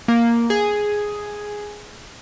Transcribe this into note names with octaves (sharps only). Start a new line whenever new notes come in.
A#3
G#4